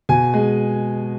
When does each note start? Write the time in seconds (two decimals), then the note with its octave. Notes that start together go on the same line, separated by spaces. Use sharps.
0.09 B2 G#5
0.34 G#3